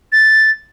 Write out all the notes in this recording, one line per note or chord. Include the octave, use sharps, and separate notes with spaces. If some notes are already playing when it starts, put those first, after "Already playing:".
A6